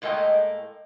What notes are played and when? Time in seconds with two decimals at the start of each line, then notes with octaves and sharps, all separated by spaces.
0.02 A2 G#3 A#3 A4 D#5 G5